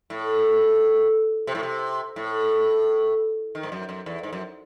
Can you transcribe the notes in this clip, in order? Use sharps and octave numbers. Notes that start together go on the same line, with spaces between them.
A2
C3
A2
C3
A2
D#3
G#2
F#2
F#2
E2
G#2
F#2